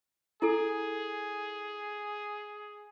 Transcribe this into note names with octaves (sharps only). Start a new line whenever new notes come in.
E4 G#4 A4